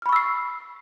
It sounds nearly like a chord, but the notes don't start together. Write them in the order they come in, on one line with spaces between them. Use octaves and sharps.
F6 B5 C#6 E6 C7